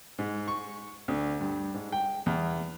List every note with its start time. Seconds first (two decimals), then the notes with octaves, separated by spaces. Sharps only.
0.19 G#2
0.48 C#6
1.08 D2
1.40 G2
1.74 G#2
1.92 G5
2.26 E2